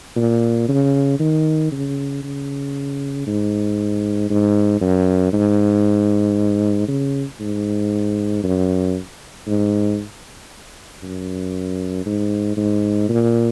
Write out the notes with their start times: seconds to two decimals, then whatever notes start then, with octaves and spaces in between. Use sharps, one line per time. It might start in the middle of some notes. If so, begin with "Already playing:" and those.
0.16 A#2
0.68 C#3
1.20 D#3
1.72 C#3
2.23 C#3
3.27 G#2
4.30 G#2
4.81 F#2
5.33 G#2
6.88 C#3
7.40 G#2
8.44 F#2
9.47 G#2
11.03 F#2
12.06 G#2
12.57 G#2
13.09 A#2